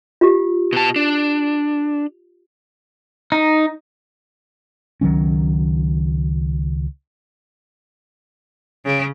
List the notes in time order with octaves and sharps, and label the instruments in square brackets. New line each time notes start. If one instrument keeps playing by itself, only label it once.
[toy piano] F4 G4
[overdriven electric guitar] B2 A5
D4
[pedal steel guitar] D#4
[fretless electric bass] C#2 D#3 F#3 C#4
[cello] C#3